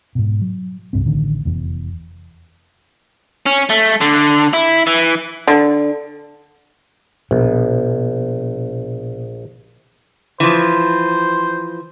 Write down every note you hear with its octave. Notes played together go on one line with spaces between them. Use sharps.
G#2 B2
F#3
C2 G2 C4
A1 D3 D#3
F1 E2
C#4
A3
D3
E4
E3
D3
A#1 B2
E3 F3 C5